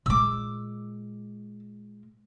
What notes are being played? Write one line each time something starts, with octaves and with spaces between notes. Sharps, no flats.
A#2 G#3 D6 E6